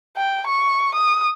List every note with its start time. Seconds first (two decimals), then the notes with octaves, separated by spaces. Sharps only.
0.17 G5
0.47 C#6
0.94 D#6